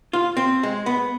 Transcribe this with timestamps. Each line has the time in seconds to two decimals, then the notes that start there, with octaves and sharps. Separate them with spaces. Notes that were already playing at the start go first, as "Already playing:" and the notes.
0.13 F4
0.37 C4
0.63 G#3
0.86 B3